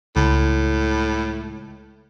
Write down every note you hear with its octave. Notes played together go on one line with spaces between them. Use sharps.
C#2 A2